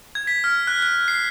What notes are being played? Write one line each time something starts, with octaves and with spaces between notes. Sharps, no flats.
G#6
B6
F6
F#6
F#6
C7